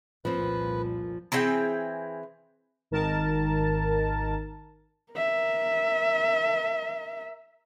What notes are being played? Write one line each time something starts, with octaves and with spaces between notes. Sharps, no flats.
F1 C2 A#2 F3 C4 B4
E3 C4 G#4 G5
G#1 D#3 A#4 A5
A#4 E5